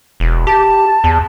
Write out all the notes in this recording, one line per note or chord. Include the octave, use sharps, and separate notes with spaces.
E1
G4 A5
E2